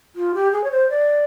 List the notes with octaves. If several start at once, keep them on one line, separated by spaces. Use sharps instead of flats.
F4
G4
G#4
C#5
C5
D5